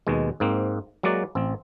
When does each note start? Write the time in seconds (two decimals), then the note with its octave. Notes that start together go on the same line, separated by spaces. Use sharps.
0.07 D#2 B2 G#3
0.40 G#2 A#3 C4
1.03 F#3 G#3 A#3 F#4 D5
1.35 A1 C4